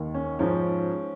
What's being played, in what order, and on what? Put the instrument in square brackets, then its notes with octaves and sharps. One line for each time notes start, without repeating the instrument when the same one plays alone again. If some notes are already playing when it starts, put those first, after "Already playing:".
Already playing: [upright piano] D#2 D#3
C#4
G#2 F3 C#4